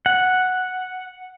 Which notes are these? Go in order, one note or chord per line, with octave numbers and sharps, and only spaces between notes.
F#5